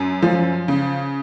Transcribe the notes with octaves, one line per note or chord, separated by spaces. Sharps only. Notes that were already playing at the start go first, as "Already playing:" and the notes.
Already playing: F#2
F3
C#3